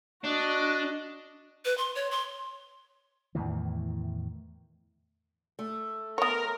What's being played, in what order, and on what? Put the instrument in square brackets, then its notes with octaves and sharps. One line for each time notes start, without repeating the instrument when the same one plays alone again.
[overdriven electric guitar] D4 [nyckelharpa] F#4 D#5
[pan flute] B4
C6
C#5
C6
[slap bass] E2 A2 D#3 E3
[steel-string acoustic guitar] A3
[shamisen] B3 C#5 [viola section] A#4